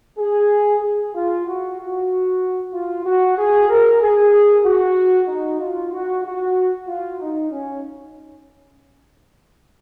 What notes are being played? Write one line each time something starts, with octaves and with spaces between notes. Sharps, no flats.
G#4
G#4
F4
F#4
F#4
F4
F#4
G#4
A#4
G#4
F#4
D#4
F4
F#4
F#4
F4
D#4
C#4